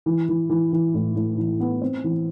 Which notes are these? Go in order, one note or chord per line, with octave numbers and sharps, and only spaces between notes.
E3
E3
E3
E3
A2
A2
E3
B3
C4
E3